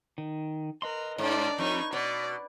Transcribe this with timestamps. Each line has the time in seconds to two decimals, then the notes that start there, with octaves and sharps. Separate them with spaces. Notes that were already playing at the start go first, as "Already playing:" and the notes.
0.18 D#3
0.82 A#4 B4 D#5 C6
1.18 G#2 D4 D5
1.58 F2 D#4 C#6
1.93 B2 D5